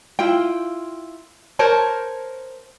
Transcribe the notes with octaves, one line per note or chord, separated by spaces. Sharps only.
E4 F4 G5
A#4 C5 C#5 A5